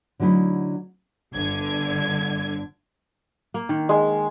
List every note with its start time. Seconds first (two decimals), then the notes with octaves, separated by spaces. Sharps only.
0.20 D3 F#3 A3 D#4 E4
1.34 G1 D3 G#6
3.54 A#3
3.69 D#3
3.89 G#3